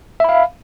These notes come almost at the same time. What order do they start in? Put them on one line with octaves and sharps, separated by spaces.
E5 B5 F5